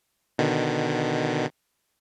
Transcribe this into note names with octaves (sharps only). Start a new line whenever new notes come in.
B2 D3 D#3